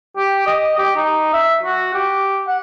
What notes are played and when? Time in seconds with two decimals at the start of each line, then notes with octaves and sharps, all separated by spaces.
0.17 G4
0.47 D#5
0.78 G4
0.97 D#4
1.33 E5
1.63 F#4
1.94 G4
2.47 F#5